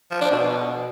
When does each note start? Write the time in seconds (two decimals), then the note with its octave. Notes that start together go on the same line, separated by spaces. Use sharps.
0.11 F3
0.21 D4
0.31 B2